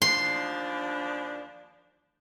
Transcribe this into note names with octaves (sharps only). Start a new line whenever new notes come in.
D#2 F3 D4 C6